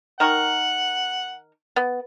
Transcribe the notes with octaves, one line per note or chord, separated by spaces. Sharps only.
D#3 A#4 F#5 C#6
B3